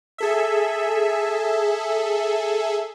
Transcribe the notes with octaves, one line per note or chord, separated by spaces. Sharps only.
G#4 A4 E5